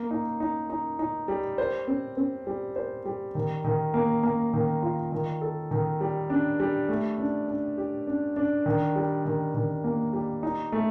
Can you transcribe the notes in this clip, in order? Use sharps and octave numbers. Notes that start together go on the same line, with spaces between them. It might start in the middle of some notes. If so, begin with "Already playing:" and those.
Already playing: A#3
D#4
D#4
D#4
D#4
G3
C5
C4
C4
G3
C5
G3
D#3
D#3
A#3
A#3
D#3
F4
D#3
A4
D#3
G3
D4
G3
A3
D4
D4
G4
D4
D4
D#3
G3
D#3
D#3
A#3
G3
D#4
A3